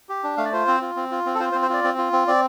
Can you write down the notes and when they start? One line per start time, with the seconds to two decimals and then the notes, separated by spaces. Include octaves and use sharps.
0.09 G4
0.23 D4
0.37 A3 F5
0.45 D5
0.53 F4 C5
0.67 C4
0.81 F4
0.96 C4
1.11 F4
1.26 C4
1.35 A4
1.40 F4 C5
1.52 C5
1.54 C4
1.62 C5
1.70 F4 D5
1.84 C4
1.98 F4
2.13 C4
2.28 C4 D5